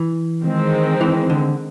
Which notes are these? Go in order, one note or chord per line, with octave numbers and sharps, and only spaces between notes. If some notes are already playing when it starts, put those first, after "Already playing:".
Already playing: E3
D#3 G#3 C4
E3
D3